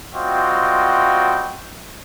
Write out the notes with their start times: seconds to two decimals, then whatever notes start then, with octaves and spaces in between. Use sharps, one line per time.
0.15 G3 C4 F4 F#4 D#5 G5